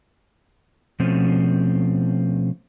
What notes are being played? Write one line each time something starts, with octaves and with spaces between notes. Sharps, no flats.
B2 F3 A3 C4 C#4